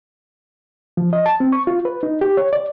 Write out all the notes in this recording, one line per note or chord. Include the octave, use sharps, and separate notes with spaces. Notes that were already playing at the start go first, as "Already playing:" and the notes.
F3
D#5
A5
C4
C#6
F4
B4
D#4
G4
C#5
D5